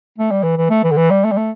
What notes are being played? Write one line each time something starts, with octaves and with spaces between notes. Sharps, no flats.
A3
G3
E3
E3
A3
E3
D3
E3
G3
A3
G3
A3